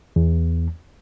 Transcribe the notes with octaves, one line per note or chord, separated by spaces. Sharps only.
E2